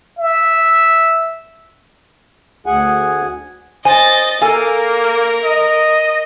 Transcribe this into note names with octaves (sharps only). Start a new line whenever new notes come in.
E5
D2 G#4 F#5 G#5
C5 D#5 G#5 A6
A#3 A4 A#4 F5 G#5
D#5